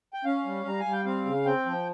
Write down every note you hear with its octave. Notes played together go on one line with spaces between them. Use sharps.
G5
C#4 F5
G3
G3 A#5
G#5
G3
G5
C4 F5
C#3
C4 G5
F3